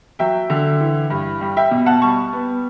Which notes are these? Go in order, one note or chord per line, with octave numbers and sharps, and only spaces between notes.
F#3 E5 G5
D3
E3
G2
G3
E5 G5
B2
F#5 A5
G3 A5 C#6
B3